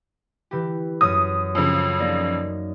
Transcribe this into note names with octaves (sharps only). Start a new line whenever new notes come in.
E3 G4
F#2 D#6
F2 C#3
A#3 D#4 D5